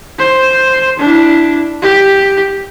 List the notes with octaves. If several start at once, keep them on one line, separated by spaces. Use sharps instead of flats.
C5
D4 E4
G4